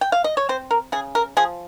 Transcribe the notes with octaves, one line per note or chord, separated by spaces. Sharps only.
G5
F5
D#5
C#5
C4 C5
A#4
C#3 G#4
A#4
F3 G#4